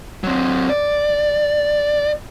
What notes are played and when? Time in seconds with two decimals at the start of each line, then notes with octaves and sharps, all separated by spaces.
0.24 F#3 C4
0.69 D5